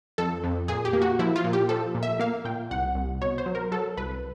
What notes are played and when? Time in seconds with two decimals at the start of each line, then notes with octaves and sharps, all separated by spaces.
0.18 F2 A4
0.44 F2
0.68 A#2 G#4
0.85 G4
0.93 A#3
1.02 F#4
1.19 F3 E4
1.36 F4
1.44 A#2
1.53 G4
1.69 F3 A4
1.95 A#2
2.03 E5
2.19 A#3 F5
2.45 A#2 G5
2.71 C2 F#5
2.95 C2
3.21 B2 C#5
3.38 C5
3.46 F#3
3.55 A#4
3.72 F#3 A4
3.97 C2 B4